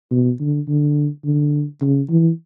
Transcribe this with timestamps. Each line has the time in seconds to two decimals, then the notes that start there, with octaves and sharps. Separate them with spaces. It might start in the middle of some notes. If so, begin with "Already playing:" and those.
0.11 B2
0.40 D3
0.68 D3
1.25 D3
1.81 C#3
2.10 E3